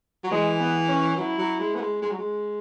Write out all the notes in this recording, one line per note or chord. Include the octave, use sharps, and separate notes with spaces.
F#3
E3 G#3
B3
C#4
F#3 E4
F#3
G#3
B3
G#3
G#3
F#3
G#3